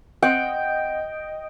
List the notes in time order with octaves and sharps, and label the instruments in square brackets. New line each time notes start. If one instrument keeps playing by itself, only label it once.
[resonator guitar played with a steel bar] C4 F#5 [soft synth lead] D#5 [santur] G5